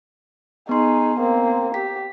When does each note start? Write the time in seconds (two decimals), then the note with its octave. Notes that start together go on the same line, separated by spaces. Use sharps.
0.69 B3 D#4 G#4 C6
1.20 A#3 C4
1.74 G4 B6